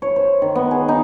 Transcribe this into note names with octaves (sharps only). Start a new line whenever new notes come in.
C#5
C5
D#3
B3
G#4
D#4